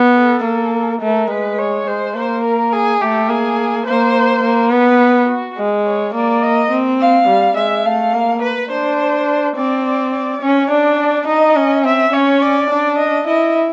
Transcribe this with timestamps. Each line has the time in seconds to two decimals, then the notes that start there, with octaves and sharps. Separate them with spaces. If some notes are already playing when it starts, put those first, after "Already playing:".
Already playing: B3
0.15 A4
0.44 A#3
1.01 A3 A#4
1.30 G#3 B4
1.58 C#5
1.87 G#3 C5
2.15 A#3 C5
2.44 A#4
2.72 G#4
3.01 A3 G4
3.29 A#3 G#4
3.87 A#3 C5
4.44 A#3
4.71 B3 B4
5.28 F#4
5.57 G#3
5.86 C#5
6.15 A#3 D5
6.42 D#5
6.71 C4
7.00 F5
7.28 G3
7.57 G#3 E5
7.85 A3 F5
8.13 A#3
8.42 B4
8.71 D4 C5
9.57 C4 D5
9.85 D5
10.13 D5
10.42 C#4 C#5
10.70 D4 D5
11.27 D#4 D#5
11.56 C#4
11.84 C4 E5
12.13 C#4 C#5
12.42 D5
12.70 D4
12.98 D#5
13.27 E4 D#5